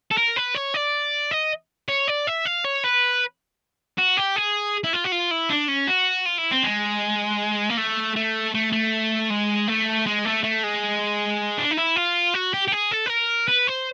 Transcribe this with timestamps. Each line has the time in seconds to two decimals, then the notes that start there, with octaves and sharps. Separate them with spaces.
0.11 A4
0.18 A#4
0.37 B4
0.55 C#5
0.74 D5
1.31 D#5
1.88 C#5
2.07 D5
2.27 E5
2.45 F5
2.64 C#5
2.84 B4
3.98 F#4
4.17 G4
4.36 G#4
4.84 E4
4.93 F4
5.04 F#4
5.12 F4
5.31 E4
5.50 D4
5.68 C#4
5.88 F#4
6.26 F4
6.38 E4
6.51 C4
6.64 G#3
7.70 A#3
7.78 A3
8.16 A3
8.54 A3
8.72 A3
9.30 G#3
9.68 A3
10.06 G#3
10.25 A3
10.43 A3
10.64 G#3
11.58 D4
11.71 D#4
11.77 E4
11.96 F4
12.34 F#4
12.54 G4
12.68 G4
12.72 G#4
12.91 A4
13.06 B4
13.10 A#4
13.48 B4
13.67 C5